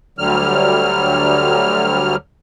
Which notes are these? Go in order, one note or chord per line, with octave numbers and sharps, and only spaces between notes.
D2 D3 F#3 G3 F6